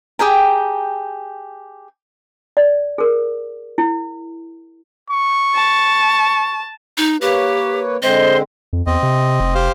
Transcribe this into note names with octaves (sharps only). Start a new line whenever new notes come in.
G4 G#4 G5 A#5
D5
G#4 A#4
E4
C#6
A5
D#4
A#3 G4 B4 C#5
D3 G#3 C4 C5 D#5
F2
E2 C4 D#5
C3
F1
G4 C5 F5